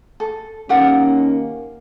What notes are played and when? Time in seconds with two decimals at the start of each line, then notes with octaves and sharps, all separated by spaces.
0.20 A4
0.69 D#3 A#3 C#4 G4 A#4 F#5